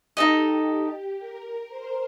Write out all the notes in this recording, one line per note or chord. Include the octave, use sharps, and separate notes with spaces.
D#4 G4 A4 D#5
A#4
C5